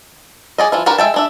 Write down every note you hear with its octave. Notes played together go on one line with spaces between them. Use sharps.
G#4 D5 D#5
E3 F3 F4
D4 F#4 G4 A#4 B4
G#3 E5 G5 A5
G#3 D4 E5